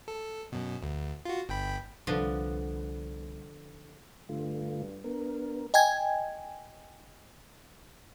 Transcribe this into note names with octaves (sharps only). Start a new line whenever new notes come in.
A4
F#2 B2
D2
F4 F#4
G1 G5 B5
C2 D3 F3 B3
G2 D3 A3 F4
B3 D4 A#4
D#5 G5 G#5 G#6